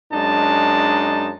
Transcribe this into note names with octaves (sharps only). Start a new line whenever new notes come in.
F#2 G#3 D4 D#4 A5